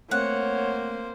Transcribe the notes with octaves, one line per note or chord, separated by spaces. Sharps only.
A3 A#3 C4 C5 C#5 F#5